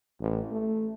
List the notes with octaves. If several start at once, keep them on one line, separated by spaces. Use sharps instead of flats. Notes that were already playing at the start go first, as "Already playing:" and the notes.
A1
A3